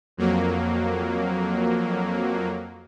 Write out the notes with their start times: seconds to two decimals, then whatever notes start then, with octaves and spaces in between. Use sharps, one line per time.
0.17 F2 F#3 A#3